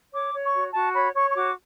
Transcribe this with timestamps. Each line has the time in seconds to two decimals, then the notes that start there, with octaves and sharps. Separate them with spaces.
0.13 C#5 D6
0.34 C#5
0.43 C#6
0.54 F#4
0.73 F#4 A5
0.94 C#5 B5
1.15 C#5 C#6
1.30 C#6
1.35 F#4 D6